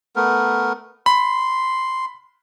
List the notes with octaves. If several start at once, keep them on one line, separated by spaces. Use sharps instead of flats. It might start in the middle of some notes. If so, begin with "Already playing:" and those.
A3 B3 A#4
B5 C6